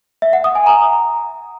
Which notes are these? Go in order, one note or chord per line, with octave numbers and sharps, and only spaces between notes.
E5
F#5
D#6
G#5
A#5